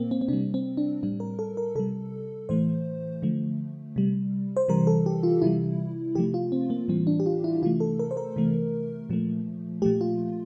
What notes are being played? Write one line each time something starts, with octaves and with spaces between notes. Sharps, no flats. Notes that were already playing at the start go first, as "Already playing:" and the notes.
Already playing: A#2 A#3 C4
C4
C4
C3 G3 D4
C4
D4
A2 G3 D4
A#4
A4
A#4
C3 G3 A4
A2 E3 A3 C5
D3 F3 A3
C3 G3
C5
C3 E3 G3 A#4
A4
G4
F4
C3 E3 G3 E4
C3 F3 A3 G4
F4
C4
A#3
A2 E3 G3 C4
D4
G4
F4
E4
C3 E3 A3 F4
A4
A#4
C5
A#4
C3 E3 A3
A#2 F3 A3
A#2 F3 A3 G4
F4